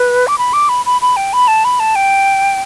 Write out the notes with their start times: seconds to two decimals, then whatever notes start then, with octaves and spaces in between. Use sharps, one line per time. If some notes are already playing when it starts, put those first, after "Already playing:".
Already playing: B4
0.27 D6
0.38 B5
0.53 D6
0.69 B5
0.86 B5
1.02 B5
1.17 G5
1.33 B5
1.48 A5
1.65 B5
1.80 A5
1.95 G5